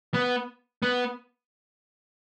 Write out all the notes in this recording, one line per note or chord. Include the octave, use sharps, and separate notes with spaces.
B3
B3